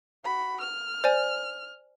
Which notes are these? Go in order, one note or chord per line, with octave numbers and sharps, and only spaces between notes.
F#4 B5
F6
C5 D5 G#5